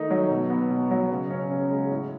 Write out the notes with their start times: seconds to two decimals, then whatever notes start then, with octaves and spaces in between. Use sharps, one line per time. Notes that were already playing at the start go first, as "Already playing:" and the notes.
Already playing: D#3 A3 D#4
0.11 F#3
0.31 B2
0.50 B3
0.70 B2
0.91 F#3
1.11 C#3
1.30 C#4
1.51 C#3
1.71 G#3
1.91 A2